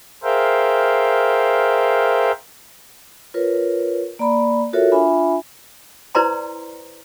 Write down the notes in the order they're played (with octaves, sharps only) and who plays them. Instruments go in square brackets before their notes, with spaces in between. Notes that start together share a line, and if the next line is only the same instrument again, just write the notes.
[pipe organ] G#4 A#4 C5 E5 F5 G5
[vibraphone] F4 A#4 B4 C#5
A#3 D5 A#5 B5
F4 F#4 A4 A#4 C#5 E5
D4 F4 E5 G#5 B5
[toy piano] E4 B4 C5 D5 A#5 C6